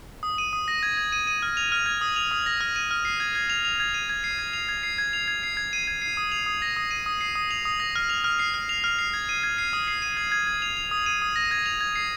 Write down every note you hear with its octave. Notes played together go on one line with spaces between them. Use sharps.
D#6
D#7
D#6
A#6
G#6
G#6
D#7
D#7
F6
F7
F6
G#6
D#6
F7
D#6
A#6
F6
D#7
F6
C7
G#6
G#6
F7
F7
G#6
D#7
G#6
C7
G#6
F7
G#6
C7
G#6
F7
G#6
C7
G#6
D#7
G#6
C7
D#6
F7
D#6
A#6
D#6
D#7
D#6
C7
D#6
F7
D#6
A#6
F6
F7
F6
C7
F6
F7
F6
C7
G#6
D#7
G#6
C7
D#6
C7
D#7
G#6
G#6
G#6
F7
F7
D#6
D#7
D#6
A#6
G#6
F7
G#6
C7